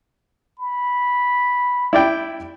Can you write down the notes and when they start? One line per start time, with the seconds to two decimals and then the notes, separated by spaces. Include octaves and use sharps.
0.59 B5
1.93 E4 D5 G5